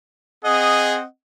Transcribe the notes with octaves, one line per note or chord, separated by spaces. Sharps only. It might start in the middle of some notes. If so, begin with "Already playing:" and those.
C4 G#4 D#5 F#5